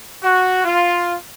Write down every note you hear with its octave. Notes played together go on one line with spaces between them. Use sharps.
F#4
F4